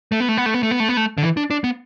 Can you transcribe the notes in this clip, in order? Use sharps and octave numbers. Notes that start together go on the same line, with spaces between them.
A3
B3
A3
B3
A3
B3
A3
B3
A3
B3
A3
D3
E3
D4
D4
B3